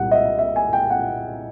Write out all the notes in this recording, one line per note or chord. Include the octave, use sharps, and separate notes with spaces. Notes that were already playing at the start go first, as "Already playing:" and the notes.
Already playing: C2 A#2 G3 F#5
D#5
E5
E5
G#5
G5
F#5